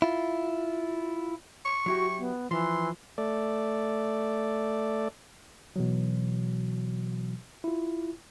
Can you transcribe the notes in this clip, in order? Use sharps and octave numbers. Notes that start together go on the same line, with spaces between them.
E4 F4
C#6
F#3 E4 F#4 G4
B3
E3 F3 C6
A3 D5
B2 E3 F#3
E4 F4